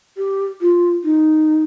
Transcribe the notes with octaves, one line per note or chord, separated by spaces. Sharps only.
G4
F4
D#4